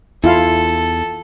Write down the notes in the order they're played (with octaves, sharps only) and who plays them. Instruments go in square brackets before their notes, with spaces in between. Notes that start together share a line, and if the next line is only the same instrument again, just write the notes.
[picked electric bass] E2 [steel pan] E4 F4 F5 [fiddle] A4